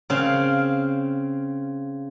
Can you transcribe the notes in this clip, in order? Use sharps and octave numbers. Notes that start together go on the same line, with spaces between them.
C#3 C4 F5